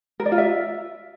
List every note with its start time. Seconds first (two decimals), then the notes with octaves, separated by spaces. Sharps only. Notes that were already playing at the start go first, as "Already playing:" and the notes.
0.20 A#4
0.26 D5
0.32 F4
0.38 E5